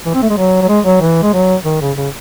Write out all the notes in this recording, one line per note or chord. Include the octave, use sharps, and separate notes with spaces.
E3
C4
A3
G#3
F#3
F#3
G#3
F#3
E3
G#3
F#3
D#3
C#3
C#3